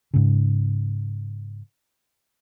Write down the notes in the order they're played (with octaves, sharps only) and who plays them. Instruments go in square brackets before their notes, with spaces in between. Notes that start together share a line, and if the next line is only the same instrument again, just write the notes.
[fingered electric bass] G#2 C#3